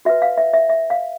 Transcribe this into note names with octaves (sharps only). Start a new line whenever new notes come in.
F#4 B4 E5
F5
E5
E5
E5
F5